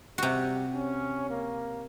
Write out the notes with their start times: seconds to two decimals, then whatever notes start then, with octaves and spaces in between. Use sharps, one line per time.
0.18 C3 G3 F#4
0.74 C#4
1.30 A#3